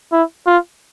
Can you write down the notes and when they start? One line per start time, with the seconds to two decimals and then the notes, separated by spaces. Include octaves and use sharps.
0.12 E4
0.47 F4